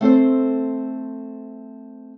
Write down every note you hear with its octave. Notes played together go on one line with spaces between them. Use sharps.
A3 C4 A4 C5